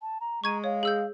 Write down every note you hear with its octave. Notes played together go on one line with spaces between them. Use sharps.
A5
A#5
G#3 A#5 C#6 G#6 D#7
C#5 F5
G#4 E6 G6